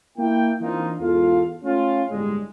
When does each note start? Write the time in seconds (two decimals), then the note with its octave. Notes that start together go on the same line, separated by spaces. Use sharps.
0.18 A#3 E4 G5
0.61 E3 A#3 C4 D4 D#4 F4
0.99 E2 G#2 F4 A4 F5
1.63 A3 C#4 F4
2.09 G1 A2 G3 G#3